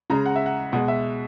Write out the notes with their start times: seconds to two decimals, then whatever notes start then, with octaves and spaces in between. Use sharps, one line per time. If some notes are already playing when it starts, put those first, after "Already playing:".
0.10 C#3 G#3 A#5
0.26 F#5
0.36 E5
0.46 F#5
0.72 B2 G#3 F#5
0.88 E5